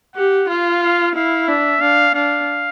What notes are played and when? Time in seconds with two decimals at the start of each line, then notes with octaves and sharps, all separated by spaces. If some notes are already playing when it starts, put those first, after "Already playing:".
0.15 G4 F#5
0.49 F4 F5
0.83 F5
1.15 E4 F5
1.48 D4 E5
1.81 D4 F5
2.14 D4 F5